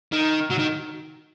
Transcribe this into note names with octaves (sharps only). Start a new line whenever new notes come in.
D#3
F#3
D#3